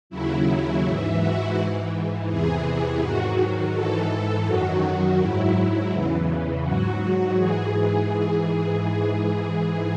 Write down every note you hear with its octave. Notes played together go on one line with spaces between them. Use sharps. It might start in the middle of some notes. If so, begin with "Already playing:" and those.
D#2 C#3 F#3 E4
G#2 E3 E4
F#4
G#2 E3
E2 C3 E3 G#4
G#2 D#3 F#3 F#4
G#2 E3 A4
F#2 D#3 F#3 F#4
G#2 F#3 E4
E2 C#3 E3
G#2 F#3 F#4
G#2 E3 G#4